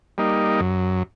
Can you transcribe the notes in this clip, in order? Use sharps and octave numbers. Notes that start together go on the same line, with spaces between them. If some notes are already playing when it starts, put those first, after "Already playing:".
G3 A#3 D#4
F#2